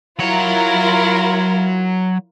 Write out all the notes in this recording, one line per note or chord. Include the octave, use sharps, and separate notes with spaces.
F#3 E4 F4 A#4 C#5